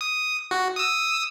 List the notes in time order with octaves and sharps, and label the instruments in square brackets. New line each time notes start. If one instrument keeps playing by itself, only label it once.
[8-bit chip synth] D#6
F#4
D#6 E6